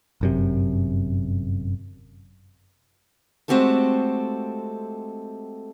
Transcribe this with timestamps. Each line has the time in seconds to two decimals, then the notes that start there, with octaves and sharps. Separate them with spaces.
0.21 G1 F#2 C3
3.48 G#3 A3 C4 F#4 G4 A4